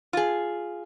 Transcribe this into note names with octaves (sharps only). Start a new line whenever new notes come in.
F4 G#4